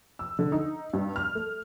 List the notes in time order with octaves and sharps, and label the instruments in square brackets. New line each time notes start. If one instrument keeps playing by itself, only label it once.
[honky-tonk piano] E6
D3
D#4
G2
F6
A3